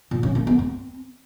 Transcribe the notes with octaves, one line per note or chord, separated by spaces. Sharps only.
A#2
C#4
A#3
B3
C4